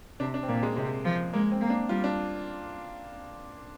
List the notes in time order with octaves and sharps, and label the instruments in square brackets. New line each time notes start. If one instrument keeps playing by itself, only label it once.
[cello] C3 [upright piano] D4
[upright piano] D4
C4
[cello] A#2 [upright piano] A#3
[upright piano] G#3
[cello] C3 [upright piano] G#3
[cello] F3
[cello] G#3 [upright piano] A#3
[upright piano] C4
[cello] A#3
[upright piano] D4
[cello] G3 [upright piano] F4
[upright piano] D4